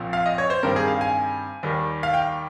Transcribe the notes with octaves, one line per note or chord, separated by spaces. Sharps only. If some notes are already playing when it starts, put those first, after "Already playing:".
Already playing: A#1 A#2 F3 C4
F5
D#5
C#5
C5
G2 D#3 G3 C4 A#4
G#4
F5
G#5
D#2 D#3 G3
F5
G5